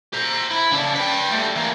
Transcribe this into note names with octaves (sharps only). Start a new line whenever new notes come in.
C5 A#5
E4
C#3 D4
B4 G5
G3 A3
E3 A#3